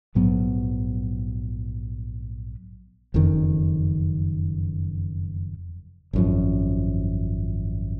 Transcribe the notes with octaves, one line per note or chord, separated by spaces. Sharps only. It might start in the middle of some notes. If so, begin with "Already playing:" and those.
A#1 G#2 F#3 B3
F#1 F2 D#3
G#1 F#2 F3